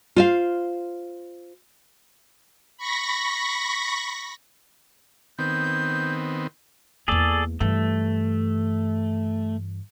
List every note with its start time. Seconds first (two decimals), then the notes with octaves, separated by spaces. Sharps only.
0.16 F4 C5 F5
2.77 B5 C#6 A#6 B6
5.39 D#3 B3 C4 G6
7.08 E2 A#3 G#4 A4 D5
7.60 G2 E3 A3